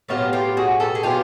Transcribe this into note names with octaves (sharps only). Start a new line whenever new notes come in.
A2 F#3 B3 F4 G4
F4 G4
F#4 G#4
G4 A4
G#4
A2 F#3 B3 F4 G4